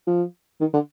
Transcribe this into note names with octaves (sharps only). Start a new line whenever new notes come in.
F3
D#3
D3